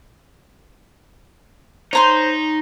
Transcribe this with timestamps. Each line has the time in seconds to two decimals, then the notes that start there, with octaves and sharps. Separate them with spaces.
1.93 D#4 C5 C#5 A#5 C6